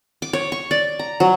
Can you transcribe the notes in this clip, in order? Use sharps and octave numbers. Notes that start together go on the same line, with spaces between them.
D6
C#5
C#6
D5
A#5
F#3